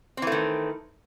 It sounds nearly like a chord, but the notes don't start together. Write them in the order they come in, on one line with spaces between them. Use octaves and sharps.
C4 E3 A3 D#3